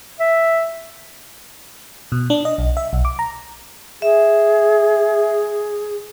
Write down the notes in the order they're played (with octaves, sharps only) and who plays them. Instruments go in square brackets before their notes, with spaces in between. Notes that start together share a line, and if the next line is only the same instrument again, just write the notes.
[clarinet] E5
[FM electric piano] B2
D4
D#5
B1
E5
B1
D6
A#5
[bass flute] G#4 [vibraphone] E5